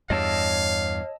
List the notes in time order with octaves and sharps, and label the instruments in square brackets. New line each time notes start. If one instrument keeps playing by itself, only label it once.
[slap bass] E2 G2 [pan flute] C#5 [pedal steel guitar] D#5 A5 E6 [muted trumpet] F5